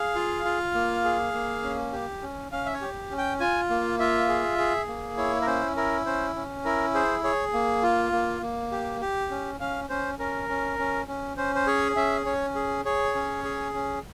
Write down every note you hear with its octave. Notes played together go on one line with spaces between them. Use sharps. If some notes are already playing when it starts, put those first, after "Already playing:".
Already playing: G#4 F5
F4
F4
A#3
G#4
A#3
C#4
G4
C#4
C#4 F5
E5
C#5
G4
C#4
G5
F4 G#5
A#3
F4 E5
G#4
G#4
A#3
E4 C#5
A#4
C#4 C5
E4 A#4
C#4 C5
C#4
E4 A#4
G#4 C5
G#4 C#5
A#3
F4
A#3
A#3
G4
G4
C#4
C#4 F5
C#4 C5
C#4 A#4
C#4
C#4
C#4
C#4 C5
C5
G#4 C#5
C#4 E5
C#4 C#5
G#4
G#4 C#5
C#4
G#4
C#4